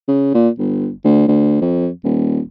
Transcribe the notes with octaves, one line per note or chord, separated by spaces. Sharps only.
C#3
A#2
G1
D2
D2
F2
D#1